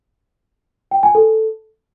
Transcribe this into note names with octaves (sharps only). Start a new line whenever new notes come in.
G5
G#5
A4